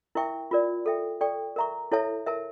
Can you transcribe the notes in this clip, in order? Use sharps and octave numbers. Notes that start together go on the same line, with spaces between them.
E4 A#4 E5 G5 C#6
F4 A#4 D5
A4 E5 G5
A4 D5 G5 C#6
A#4 E5 A#5 C#6
E4 A4 C#5 E5 A5
A#4 E5 A5